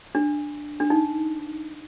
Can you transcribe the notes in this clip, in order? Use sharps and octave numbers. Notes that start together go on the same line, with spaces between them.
D4
D4
D#4